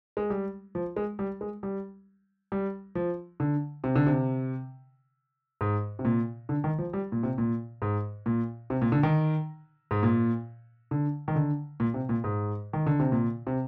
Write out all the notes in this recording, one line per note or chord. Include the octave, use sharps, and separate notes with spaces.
G#3
G3
F3
G#3
G3
G#3
G3
G3
F3
D3
C3
D3
C3
G#2
C3
A#2
D3
D#3
F3
G3
A#2
C3
A#2
G#2
A#2
C3
A#2
D3
D#3
G#2
A#2
D3
D#3
D3
A#2
C3
A#2
G#2
D#3
D3
C3
A#2
C3